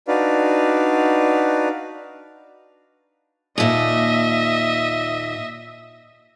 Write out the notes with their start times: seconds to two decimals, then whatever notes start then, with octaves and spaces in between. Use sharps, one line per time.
0.08 D4 D#4 F#4 B4 D5 F5
3.58 D#2 A#2 D#5 E5